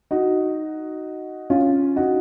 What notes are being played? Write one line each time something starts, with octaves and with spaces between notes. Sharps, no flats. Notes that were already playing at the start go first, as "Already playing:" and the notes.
D#4 F#4
C#4 F4
D#4 F#4